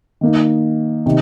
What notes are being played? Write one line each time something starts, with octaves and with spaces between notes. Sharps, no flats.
D#3 A#3 D#4
C3 D#3